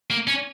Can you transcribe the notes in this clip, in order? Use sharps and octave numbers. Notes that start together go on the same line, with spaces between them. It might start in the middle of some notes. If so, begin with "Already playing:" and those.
A#3
C#4